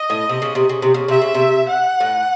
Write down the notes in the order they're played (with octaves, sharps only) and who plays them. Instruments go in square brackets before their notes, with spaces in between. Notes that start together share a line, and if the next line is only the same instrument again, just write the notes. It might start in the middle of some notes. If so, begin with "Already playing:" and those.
Already playing: [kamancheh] D#5
[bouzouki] A2
C3
C#3
C3
C#3
C3
C#3
[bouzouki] C3 [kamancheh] E5
[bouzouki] C#3
C3
[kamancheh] F#5
[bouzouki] A2